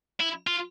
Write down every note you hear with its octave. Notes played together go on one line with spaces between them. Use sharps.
E4
F4